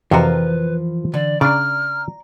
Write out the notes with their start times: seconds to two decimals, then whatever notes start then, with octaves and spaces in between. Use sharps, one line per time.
0.11 F2 C3 E3 F3 F#4 A#4 B4
1.14 D3 D5
1.41 C#3 D4 D5 A#5 F6